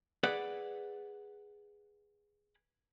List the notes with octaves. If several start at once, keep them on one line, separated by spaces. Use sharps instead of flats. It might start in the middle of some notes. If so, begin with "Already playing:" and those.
G#4 B4 D5 F#5